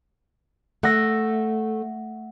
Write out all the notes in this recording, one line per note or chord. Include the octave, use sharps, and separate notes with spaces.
A3 F#5 E6 A#6